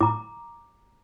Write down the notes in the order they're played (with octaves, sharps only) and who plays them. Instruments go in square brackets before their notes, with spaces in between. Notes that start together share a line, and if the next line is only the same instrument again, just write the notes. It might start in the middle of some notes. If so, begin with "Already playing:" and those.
[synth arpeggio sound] A2 [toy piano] A#5 D6